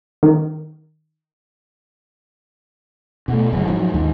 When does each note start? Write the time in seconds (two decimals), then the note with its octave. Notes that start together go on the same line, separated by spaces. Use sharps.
0.23 D#3
3.28 B2 A3
3.52 G1 F#2 C#3
3.68 G#2 F3 F#3
3.94 D#2 G#2